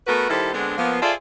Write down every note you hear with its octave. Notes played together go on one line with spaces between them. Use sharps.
A3 B3 F#4 A#4 B4
D#3 G3 E4 G4 A4 C5
D3 G#3 B3 C4 D4
F3 A#3 B3
F4 G#4 A4 C5 D5 E5